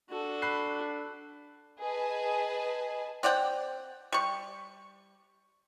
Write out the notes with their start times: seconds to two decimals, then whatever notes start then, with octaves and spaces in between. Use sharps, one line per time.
0.10 D4 F#4 A4
0.42 B5 F#6 C7
1.81 G#4 B4 D#5 G#5 A5
3.23 C4 D5 F#5 G5
4.12 G3 C#6